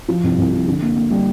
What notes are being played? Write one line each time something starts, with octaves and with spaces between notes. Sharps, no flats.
F3
C2
C2
F3
D3
A#3
A#3
G3